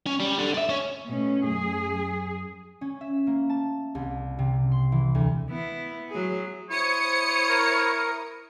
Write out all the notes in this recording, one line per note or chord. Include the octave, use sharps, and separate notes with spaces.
C#4
G3
D3
D5 E5
C#4
B2 A3 C#4
F#2 G#4
C#4
E5
A#3
A5
C2
C3
C6
E3
D2
B3 E4
F#3 G#4
E4 C5 C#5 D#6 C#7
A#4